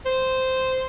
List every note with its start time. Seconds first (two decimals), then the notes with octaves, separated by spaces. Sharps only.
0.06 C5